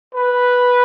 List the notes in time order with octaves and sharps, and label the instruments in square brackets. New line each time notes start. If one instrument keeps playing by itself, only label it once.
[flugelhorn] B4